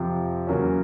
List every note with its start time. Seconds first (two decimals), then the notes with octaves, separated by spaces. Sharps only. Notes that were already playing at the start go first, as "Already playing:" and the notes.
Already playing: F2 C3 F3
0.47 E2 C#3 F#3 A#3 C#4